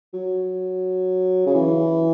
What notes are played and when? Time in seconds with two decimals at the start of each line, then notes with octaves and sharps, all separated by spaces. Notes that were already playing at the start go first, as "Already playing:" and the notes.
0.13 F#3
1.46 C#3
1.54 E3